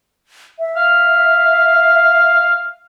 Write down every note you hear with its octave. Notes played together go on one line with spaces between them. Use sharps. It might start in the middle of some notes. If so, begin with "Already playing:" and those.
E5
F5